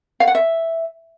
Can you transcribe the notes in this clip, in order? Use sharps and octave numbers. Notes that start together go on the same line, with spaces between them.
F5
F#5
E5